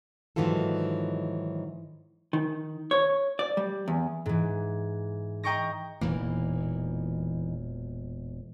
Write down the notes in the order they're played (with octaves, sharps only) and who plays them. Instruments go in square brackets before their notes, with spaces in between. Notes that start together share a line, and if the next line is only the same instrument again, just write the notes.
[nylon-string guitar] G#2 D#3 E3 F#3 F4 A4
[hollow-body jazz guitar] D#3
C#5
D5
G3
E2
[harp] G#2 E3
D#5 G5 A#5 C#6 D6 A#6
[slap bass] E1 A#2 A#3 [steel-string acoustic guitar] E3 D#4